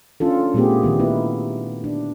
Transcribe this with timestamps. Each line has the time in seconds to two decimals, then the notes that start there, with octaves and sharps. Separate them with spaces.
0.20 C#4 D4 F4 A4
0.54 A#2 G3 A3 B3 G4 G#4
0.83 D#3 G3 A#3
0.99 B3 D#4 E4 B4
1.84 D4